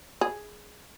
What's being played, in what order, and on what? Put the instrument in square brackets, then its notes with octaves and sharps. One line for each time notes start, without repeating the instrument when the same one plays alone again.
[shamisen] G#4